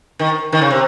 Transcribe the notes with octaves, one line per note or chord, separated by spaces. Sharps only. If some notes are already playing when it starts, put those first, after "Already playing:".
D#3
D#3
C#3
C3